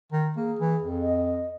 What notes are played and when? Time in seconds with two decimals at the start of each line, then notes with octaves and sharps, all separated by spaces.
0.12 D#3
0.37 A#3 G#4
0.59 E3
0.82 F2
1.02 D#5